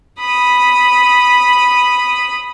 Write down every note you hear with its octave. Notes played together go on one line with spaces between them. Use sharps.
B5 D#6